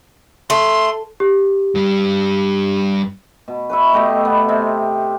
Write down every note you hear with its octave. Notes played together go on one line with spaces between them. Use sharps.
A3 C6
G4
G2 G3
B2
B4 C#5 E5
B2 A3 G4 D#5
B3
C3 C4